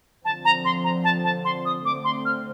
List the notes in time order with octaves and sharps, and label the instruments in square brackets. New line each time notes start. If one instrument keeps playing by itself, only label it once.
[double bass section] D3 F3 C4 [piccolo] A5
[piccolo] A#5
C6
A#5
A5
A5
C6
D#6
[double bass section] D3 A3 C4 [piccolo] D6
[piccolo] C6
F6